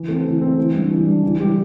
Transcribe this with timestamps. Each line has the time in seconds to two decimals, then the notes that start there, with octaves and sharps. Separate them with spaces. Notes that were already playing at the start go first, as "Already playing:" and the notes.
Already playing: E3
0.08 A3 C4
0.25 E3
0.41 A3 C4
0.58 E3
0.74 G3 D4
0.91 E3
1.07 G3 D4
1.23 E3
1.39 G3 E4 G4